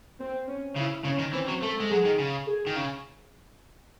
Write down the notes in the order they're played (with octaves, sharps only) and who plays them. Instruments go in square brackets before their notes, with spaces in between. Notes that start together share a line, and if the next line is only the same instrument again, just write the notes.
[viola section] C4
C#4
[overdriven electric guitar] C#3 [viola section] E4
[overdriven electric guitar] C#3 [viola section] C#4
[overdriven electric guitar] D#3
[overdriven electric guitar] E3 [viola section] C4
[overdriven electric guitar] F#3
[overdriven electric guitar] A3 [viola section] A4
[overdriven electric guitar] G#3
[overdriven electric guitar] F#3 [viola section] G#4
[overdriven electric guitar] D#3
C#3
[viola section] G#4
[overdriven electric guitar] D#3
C#3